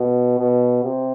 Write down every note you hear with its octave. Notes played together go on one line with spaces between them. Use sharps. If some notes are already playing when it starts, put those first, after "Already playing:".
Already playing: B2
B2
C3